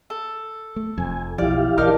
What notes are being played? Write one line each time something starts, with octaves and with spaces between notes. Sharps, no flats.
A4
A3
F1 F2 G#5
B1 F3 E4 G4 D5 F5
A#1 E3 D#4 A#4 D5 A5 D6 F6